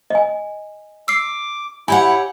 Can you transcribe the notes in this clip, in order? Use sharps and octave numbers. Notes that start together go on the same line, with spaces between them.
D#5 G#5
D6 E6 C7
E4 G4 C#5 F#5 G#5